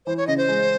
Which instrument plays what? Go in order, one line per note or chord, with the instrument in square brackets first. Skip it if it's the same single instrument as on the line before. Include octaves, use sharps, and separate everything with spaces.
[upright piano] E3 [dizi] C5
[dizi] C#5
[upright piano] C#3 [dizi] D#5
[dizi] C5
[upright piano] G#3